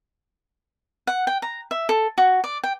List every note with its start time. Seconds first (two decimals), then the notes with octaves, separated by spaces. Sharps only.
1.07 F#5
1.27 G5
1.42 A#5
1.71 E5
1.89 A4
2.18 F#4
2.44 D5
2.64 G5